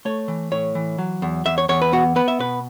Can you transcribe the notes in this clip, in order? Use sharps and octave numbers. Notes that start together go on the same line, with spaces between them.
A3 C#5
E3
A2 C#5
E3
F#3
E2
E2 E5
C#5
E2 C#5
B4
B3 F#4
B3 B4
E5
B2 B4